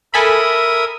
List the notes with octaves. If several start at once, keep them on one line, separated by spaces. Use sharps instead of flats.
A4 A#4 E5 G#5 B5 D#6